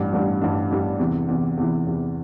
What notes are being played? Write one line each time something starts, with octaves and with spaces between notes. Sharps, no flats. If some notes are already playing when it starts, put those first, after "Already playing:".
Already playing: A1 G2 G3 D4
A1 G2 G3 D4
A1 G2 G3 D4
A1 G2 G3 D4
E2 C3 E3
E2 C3 E3
E2 C3 E3
E2 C3 E3